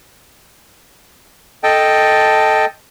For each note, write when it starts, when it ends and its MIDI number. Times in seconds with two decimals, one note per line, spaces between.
1.63 2.65 69
1.63 2.65 75
1.63 2.65 79
1.63 2.65 81